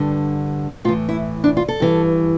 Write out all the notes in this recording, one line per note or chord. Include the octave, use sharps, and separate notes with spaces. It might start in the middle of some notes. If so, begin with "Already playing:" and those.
Already playing: G2 D3
A2 E3 F4
E4
D4
F4
A4
G2 E3